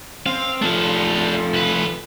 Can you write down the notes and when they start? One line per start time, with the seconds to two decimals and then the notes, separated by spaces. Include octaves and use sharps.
0.26 C4 F5
0.62 F3 A3 D4 F5
1.53 C2 B4